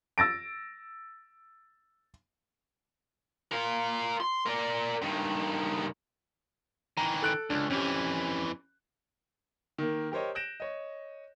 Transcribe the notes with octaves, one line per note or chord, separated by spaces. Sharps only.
E6 A6 A#6 D7
F4 A#4
C6
A#4 D5
G2 D#3
D#3 E3 A#5
A4 F#6 D7
C#2 D4
F2 E3 C#4 G4
D#3 A#3
G4 A#4 C5 C#5 D#5
F#6 G6 A#6 D7 E7
C#5 D#5